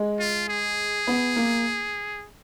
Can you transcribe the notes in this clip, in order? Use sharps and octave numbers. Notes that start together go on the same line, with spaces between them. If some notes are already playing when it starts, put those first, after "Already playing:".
Already playing: G#3
F4
G#4
B3
A#3